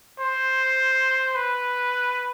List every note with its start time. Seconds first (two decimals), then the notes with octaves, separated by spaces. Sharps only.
0.20 C5
1.36 B4